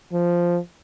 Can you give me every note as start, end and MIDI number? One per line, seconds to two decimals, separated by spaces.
0.13 0.58 53